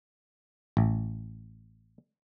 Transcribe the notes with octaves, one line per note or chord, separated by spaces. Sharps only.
A1